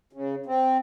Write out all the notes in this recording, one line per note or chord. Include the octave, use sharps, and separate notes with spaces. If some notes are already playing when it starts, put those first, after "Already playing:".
C#3
C4